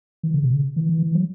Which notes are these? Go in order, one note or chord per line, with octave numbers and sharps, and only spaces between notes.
E3
C#3
B2
C#3
E3
E3
E3
F#3